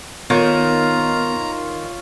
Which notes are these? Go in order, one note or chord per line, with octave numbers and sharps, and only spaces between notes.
D#3 B3 F4 C#5 A#5